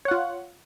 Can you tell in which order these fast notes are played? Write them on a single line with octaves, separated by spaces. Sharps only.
C#5 F#5 F4